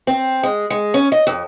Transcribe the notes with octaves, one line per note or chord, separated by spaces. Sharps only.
C4
G#3
G#3
C#4
D#5
F2